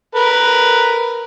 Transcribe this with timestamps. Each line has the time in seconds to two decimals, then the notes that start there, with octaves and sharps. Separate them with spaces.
0.15 A#4 B4